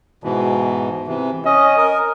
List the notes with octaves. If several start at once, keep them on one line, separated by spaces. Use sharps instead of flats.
G#2 B2 E3
C3 E3
C#4 D#5
A#4